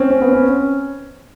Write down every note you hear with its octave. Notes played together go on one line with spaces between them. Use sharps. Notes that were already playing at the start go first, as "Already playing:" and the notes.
Already playing: C4 C#4
C#4
B3
C#4